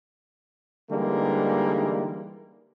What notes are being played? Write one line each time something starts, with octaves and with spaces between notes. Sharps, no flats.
D3 E3 G3 G#3 A#3 D#4